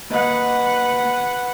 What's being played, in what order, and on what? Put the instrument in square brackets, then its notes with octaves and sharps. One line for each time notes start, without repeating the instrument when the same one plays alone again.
[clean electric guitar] A#3 D#5 [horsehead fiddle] B4 F#5